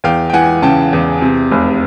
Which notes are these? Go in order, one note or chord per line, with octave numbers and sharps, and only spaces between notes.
E2 F5 G5
G5
E3 F#5 G#5
C#3 G5 A5
E2
C3
F1